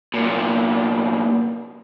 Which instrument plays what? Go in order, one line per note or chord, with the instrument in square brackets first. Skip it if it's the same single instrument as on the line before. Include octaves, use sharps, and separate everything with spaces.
[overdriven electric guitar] C2 A#2